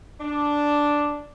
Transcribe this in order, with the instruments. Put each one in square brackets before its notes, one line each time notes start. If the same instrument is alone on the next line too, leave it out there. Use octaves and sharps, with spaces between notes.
[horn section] D4